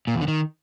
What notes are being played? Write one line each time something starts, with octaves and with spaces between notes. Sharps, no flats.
A#2
E2
D3
D#3